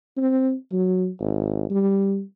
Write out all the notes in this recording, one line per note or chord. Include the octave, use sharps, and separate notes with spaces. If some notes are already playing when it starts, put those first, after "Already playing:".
C4
F#3
G#1
G3